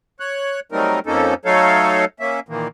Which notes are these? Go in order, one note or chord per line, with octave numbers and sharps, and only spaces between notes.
C#5 F#6
F#3 G3 A3 C4 D#4 A#4
F2 F3 A#3 C#4 D#4 A4
F#3 A3 D#4 A4 C#5 F5
A#3 C#4 E5
A#2 D#3 E3 A#3